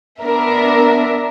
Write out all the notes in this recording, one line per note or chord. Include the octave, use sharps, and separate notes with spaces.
B3 D4 A#4 E5